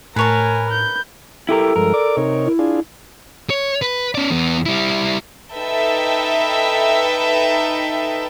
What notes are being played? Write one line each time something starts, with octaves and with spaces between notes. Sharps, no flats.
A2 A#4 B4 C#5 G#5 A5
G6
E4 G4 A4 A#4
G2 F3 G#3 A#4
D5 D6
C3 D#4 C#5
E4
D4 F4 G#4
C#5
B4
C#4 D5
E2 B3
G3 E4
D#4 A4 B4 E5 G5